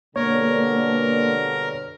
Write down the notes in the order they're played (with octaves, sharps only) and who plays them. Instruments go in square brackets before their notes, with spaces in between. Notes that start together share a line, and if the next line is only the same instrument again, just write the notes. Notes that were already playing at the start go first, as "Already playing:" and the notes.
[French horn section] G2 B2 D3 [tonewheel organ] A#3 [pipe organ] A#4 [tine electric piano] C#5